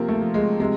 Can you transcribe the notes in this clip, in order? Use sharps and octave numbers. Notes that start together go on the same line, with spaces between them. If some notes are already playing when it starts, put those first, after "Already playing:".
Already playing: C3 F3 A#3 C4
A3
F3
G#3
C3 G#3